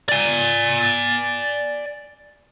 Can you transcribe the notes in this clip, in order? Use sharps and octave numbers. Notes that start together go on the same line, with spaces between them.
D5 G#5